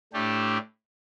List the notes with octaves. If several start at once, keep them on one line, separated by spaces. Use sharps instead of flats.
A2 A3 D4 G4